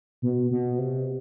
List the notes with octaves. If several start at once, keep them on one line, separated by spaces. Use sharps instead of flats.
B2
B2
C3